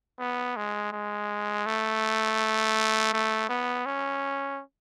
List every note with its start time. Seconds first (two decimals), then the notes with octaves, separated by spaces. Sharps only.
0.19 B3
0.57 G#3
0.92 G#3
1.66 A3
3.13 A3
3.49 B3
3.86 C#4